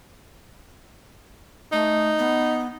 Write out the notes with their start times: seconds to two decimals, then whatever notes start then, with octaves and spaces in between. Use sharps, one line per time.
1.72 A3 D#4
2.19 B3